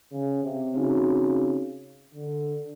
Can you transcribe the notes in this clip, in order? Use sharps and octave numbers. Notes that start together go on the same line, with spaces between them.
C#3
C3
C#3 C4 D#4 F#4
D3